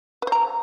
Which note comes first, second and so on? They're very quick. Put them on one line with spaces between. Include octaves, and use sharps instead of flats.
B4 C5 A#5